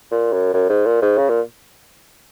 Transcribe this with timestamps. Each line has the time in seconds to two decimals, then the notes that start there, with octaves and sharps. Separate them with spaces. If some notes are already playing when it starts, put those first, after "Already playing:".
0.11 A#2
0.33 F#2
0.53 F#2
0.70 G#2
0.86 A#2
1.02 G#2
1.18 C#3
1.29 A#2